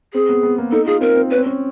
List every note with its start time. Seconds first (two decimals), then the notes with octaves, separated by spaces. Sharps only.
0.14 C4 G#4
0.29 B3
0.43 B3
0.58 A#3
0.72 D#4 A4
0.86 F4 G#4
1.01 C4 A#4
1.15 C4
1.30 C#4 B4
1.38 C4
1.46 C#4